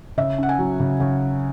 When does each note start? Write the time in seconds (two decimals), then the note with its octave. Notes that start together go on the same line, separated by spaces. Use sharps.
0.17 C#3 E5
0.38 C#4 F#5
0.49 G#5
0.59 F#3
0.80 C#3
1.00 C#3